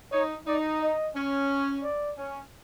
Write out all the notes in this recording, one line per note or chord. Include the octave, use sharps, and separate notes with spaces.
D#4 C#5
D#4 D5
D#5
C#4
D5
C#4